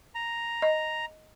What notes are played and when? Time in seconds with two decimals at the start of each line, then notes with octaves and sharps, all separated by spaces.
0.15 A#5
0.62 D#5